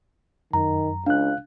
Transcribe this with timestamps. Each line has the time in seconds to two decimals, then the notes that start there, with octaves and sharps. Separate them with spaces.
0.53 F#2 D#3 A#5
1.06 C#2 D4 F5 F#6